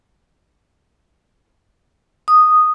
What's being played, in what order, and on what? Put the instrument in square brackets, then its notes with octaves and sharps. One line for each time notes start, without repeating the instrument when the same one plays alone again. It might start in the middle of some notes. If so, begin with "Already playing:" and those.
[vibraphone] D#6